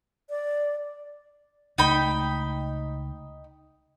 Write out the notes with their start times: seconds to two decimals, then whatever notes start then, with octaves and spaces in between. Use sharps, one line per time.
0.30 D5
1.78 C#2 A3 D#4 G5 B5